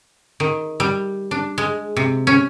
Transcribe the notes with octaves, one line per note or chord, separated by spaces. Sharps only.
D#3
G3
D4
G#3
C3
C#4